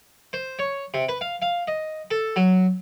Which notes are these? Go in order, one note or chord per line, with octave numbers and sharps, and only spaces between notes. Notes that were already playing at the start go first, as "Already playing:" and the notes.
C5
C#5
C3
B4
F5
F5
D#5
A4
F#3